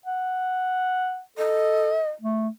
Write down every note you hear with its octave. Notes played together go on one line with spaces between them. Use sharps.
F#5
A4 D#5
A3